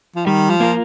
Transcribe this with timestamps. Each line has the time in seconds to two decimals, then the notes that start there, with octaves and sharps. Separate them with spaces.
0.16 F3
0.26 D#3 G3
0.50 F3
0.60 A#3 F4 A#4